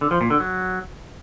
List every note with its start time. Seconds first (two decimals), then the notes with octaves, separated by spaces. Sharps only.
0.01 D3
0.11 F3
0.21 A#2
0.30 D3
0.40 F#3